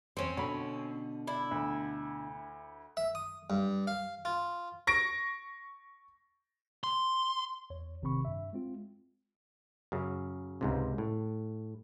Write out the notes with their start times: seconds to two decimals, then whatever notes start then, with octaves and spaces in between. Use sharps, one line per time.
0.17 E2 G2 C4 C#4 C5
0.37 B2 D3 C#5 B5
1.27 D4 E4
1.51 D2
2.97 E5
3.15 D#6
3.50 G2
3.87 F5
4.25 F4
4.87 C#6 A#6 D7
6.84 C6
7.70 E2 C#5
8.02 G#1 C3 D#3 C4 B5 C#6
8.25 G2 E5
8.53 G#3 C4 F4
9.92 F#2 C#3
10.61 C#2 G#2 C3
10.98 A2